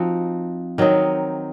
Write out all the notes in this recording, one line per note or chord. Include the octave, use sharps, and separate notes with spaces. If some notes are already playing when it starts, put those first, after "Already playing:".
Already playing: F3 C4 D#4 F#4
D#3 F#3 C4 D#4